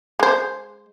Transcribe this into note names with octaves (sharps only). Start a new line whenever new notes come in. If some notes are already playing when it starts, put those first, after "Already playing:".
G#3 C5